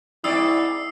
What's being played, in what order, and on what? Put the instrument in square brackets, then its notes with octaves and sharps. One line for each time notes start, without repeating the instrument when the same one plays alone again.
[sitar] G#2 C4 D5 [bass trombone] E4 [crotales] D#6 E6 C7